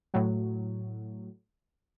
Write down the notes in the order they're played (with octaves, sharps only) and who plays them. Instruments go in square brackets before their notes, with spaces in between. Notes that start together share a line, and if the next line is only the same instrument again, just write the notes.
[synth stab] A2 F#3